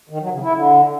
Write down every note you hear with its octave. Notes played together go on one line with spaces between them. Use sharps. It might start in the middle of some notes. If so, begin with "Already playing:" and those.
D#3
F#3
C#3
E4
D3